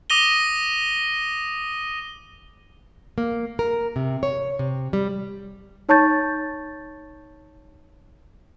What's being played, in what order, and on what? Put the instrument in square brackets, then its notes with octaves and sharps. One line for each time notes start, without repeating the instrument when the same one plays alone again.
[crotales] D6 D#6 A#6 D#7 G7
[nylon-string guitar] A#3
A#4
C3
C#5
C3
G3
[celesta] D#4 C#5 A5 C#6 G6 A6